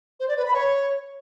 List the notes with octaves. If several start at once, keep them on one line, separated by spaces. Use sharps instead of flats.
C5
D5
B4
B5
C#5